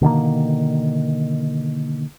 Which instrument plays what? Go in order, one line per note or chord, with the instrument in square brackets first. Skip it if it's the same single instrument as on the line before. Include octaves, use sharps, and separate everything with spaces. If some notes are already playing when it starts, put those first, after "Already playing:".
[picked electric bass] B2 D3 D#3 A#3